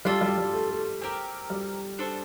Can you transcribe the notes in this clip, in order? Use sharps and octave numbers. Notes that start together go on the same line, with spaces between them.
G3 D4 F4 A4
G3
G3
A3
A3
C4 G4 A#4
G3
D4 A4 C5